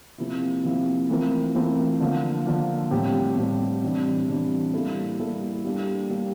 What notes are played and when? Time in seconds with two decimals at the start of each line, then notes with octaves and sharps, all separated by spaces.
0.18 C3 F3 A#3 E4
0.64 C3 F3 A#3 E4
1.09 E3 A3 C4 F4 A#4
1.55 E3 A3 C4 F4 A#4
2.00 D3 F3 A#3
2.46 D3 F3 A#3
2.91 A2 G3 C4 G4
3.37 A2 G3 C4 G4
3.82 C3 E3 G3 D4
4.28 C3 E3 G3 D4
4.73 G3 A#3 E4 A4
5.19 G3 A#3 E4 A4
5.64 G3 A#3 D4 G4
6.10 G3 A#3 D4 G4